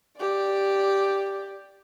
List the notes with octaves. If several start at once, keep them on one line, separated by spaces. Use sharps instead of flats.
G4 D5